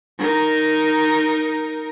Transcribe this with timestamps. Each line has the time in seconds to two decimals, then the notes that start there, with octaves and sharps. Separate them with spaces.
0.18 D#4 A#4